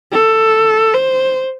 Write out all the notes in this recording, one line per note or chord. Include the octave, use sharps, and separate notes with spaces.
A4
C5